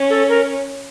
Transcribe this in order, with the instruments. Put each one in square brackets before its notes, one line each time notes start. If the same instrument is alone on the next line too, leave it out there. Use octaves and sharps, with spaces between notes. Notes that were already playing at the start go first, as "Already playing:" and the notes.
Already playing: [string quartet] C#4
[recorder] A4
A#4